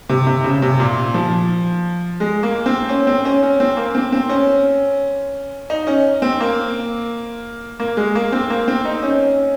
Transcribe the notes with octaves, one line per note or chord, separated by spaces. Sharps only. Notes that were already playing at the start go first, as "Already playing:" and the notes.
C3
C3
C#3
C3
A#2
F3
G#3
A#3
C4
C#4
C4
C#4
C#4
C4
A#3
C4
C4
C#4
D#4
C#4
C4
A#3
A#3
G#3
A#3
C4
A#3
C4
D#4
C#4